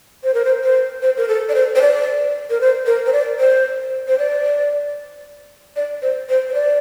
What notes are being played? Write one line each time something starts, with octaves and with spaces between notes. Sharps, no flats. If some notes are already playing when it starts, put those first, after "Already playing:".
C5
A#4
C5
C5
C5
A#4
A4
D5
C5
C5
D5
A#4
C5
A#4
C5
D5
C5
C5
D5
D5
C5
C5
C5
D5